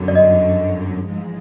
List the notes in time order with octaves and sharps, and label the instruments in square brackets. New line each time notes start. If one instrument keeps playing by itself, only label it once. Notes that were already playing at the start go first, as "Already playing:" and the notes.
Already playing: [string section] G1 F#2 D3 F#3
[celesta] D5
D#5
[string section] A1 G#2 F3 G#3